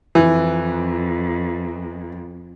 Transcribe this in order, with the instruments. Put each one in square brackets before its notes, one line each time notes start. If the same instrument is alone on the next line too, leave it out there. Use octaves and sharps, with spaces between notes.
[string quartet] F2 [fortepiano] E3